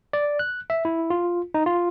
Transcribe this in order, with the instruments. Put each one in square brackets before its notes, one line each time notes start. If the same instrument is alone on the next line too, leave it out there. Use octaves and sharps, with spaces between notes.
[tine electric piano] D5
F#6
E5
E4
F4
D#4
F4